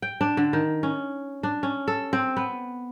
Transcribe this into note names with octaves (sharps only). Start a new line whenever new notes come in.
G5
D4
D3
D#3
C#4
D4
C#4
A4
C4
B3